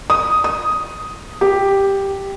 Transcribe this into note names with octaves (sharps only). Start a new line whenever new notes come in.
D#6
D#6
G4